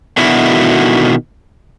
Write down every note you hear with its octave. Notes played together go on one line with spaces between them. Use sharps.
B2 D3 D#3 B3 E4 F#4